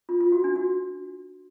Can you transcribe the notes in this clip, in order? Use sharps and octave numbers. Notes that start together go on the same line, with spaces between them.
F4
F4
F#4
D4
F#4